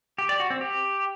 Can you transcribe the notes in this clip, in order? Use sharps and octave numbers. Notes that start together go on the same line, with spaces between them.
G4
D5
F#4
C4
G4